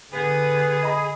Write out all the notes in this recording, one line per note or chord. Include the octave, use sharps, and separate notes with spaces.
D3 B3 G#4
D#5 B5 D#6